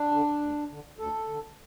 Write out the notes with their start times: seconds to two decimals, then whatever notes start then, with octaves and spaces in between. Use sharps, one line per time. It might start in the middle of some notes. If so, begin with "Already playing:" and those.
Already playing: D4
0.11 D3
0.41 D2
0.70 D3
0.98 D2 A4
1.28 D3